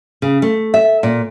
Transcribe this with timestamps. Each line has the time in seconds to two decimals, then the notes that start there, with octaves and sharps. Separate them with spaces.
0.22 C#3
0.42 A3
0.74 E5
1.03 A#2